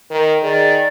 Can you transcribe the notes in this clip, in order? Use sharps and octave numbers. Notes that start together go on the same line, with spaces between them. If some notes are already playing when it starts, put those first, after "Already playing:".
D#3 A#4
D#3 G#4 D5